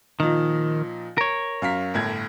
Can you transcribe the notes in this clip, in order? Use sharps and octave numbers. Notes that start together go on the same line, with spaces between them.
A#2 D#3 F3 D#4
A#4 C#5
F#2 F5 B6
G1 A2 G#6